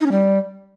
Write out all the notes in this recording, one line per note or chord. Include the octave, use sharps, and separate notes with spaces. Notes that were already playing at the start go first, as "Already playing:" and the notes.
D#4
C#4
G3